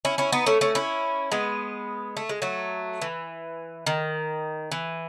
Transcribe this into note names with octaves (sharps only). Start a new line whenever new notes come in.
C#4 E4
C#4 E4
B3 D#4
A3 C#4
A3 C#4
C#4 E4
G#3 B3
A3
G#3
F#3 A3
E3
D#3
E3